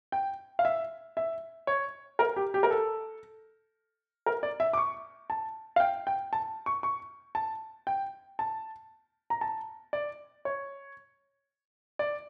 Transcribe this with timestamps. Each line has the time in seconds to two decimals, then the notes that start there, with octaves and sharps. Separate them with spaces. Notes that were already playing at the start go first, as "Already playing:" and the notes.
0.12 G5
0.59 F5
0.65 E5
1.17 E5
1.67 C#5
2.19 A#4
2.36 G4
2.54 G4
2.63 A#4
2.71 A4
4.26 A#4
4.43 D5
4.60 E5
4.73 D6
4.77 C#6
5.30 A5
5.76 F5
5.80 G5
6.07 G5
6.33 A5
6.66 C#6
6.83 C#6
7.35 A5
7.87 G5
8.39 A5
9.30 A#5
9.41 A5
9.93 D5
10.45 C#5
11.99 D5